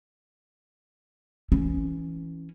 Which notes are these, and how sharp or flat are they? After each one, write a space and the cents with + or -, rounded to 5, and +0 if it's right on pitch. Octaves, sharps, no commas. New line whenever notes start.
E3 +0 C#4 +0